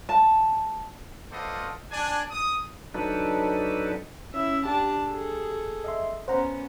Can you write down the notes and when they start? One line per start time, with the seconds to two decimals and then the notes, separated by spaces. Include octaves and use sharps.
0.09 A5
1.31 B3 F4 A4 C5 D5 D#5
1.91 D4 G#5
2.31 D#6
2.94 F#3 D4 D#4 A4 B4
4.34 C#4 E4 E5 E6
4.65 D4 G4 A5
5.07 G#4 A4
5.84 D#5 E5 C6
6.28 B3 C#4 C5 F#5 A#5